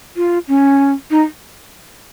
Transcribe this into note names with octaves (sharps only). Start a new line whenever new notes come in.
F4
C#4
D#4